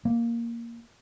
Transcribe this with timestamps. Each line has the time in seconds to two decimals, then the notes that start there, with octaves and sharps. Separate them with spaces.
0.05 A#3